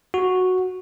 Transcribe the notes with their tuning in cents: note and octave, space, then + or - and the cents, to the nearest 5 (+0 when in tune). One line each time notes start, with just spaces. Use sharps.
F#4 -5